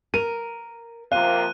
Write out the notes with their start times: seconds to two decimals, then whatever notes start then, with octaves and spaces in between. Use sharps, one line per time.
0.14 A#4 D#7
1.12 C3 F3 A#3 F5 F#6 D#7